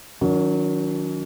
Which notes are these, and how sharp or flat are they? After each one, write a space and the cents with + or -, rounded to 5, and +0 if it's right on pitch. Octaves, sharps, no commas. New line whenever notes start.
D#3 +0 F#3 -15 C#4 +40